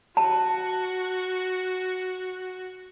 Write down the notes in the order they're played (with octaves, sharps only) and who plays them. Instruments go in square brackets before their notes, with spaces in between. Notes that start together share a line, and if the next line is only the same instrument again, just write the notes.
[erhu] F#4 [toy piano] A5